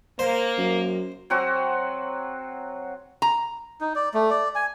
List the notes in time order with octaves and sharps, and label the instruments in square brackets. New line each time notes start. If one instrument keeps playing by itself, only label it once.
[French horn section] A#3 [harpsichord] C5
[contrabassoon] F#2
[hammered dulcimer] F#3 C4 F#4
[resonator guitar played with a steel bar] A#5
[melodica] D#4
D5
A3
D5
G#5